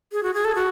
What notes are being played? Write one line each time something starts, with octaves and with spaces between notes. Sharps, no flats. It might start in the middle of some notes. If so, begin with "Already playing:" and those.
G#4
F#4
G#4
A4
F#4